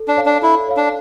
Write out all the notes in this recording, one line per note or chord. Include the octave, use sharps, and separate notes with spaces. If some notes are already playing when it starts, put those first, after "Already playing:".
Already playing: A4
D4
C#5 F5
D4
E4 A4
C#5 F5
D4